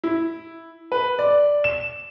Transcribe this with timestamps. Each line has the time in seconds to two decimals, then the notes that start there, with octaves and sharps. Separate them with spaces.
0.04 E4
0.92 B4
1.19 D5
1.64 E7